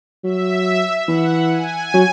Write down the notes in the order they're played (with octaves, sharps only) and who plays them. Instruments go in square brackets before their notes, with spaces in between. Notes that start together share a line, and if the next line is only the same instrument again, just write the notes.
[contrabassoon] F#3 [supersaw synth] E5
[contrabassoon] E3 [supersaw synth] F#5
[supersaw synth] G#5
[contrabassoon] F#3